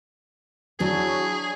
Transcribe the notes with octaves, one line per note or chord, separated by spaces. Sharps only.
F#3 D4 E4 F#4 G#4 C#5 D5